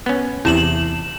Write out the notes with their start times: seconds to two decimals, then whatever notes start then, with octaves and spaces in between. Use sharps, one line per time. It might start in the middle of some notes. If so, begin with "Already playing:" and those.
0.06 B3 C#4
0.45 E2 C3 E4 E7 F#7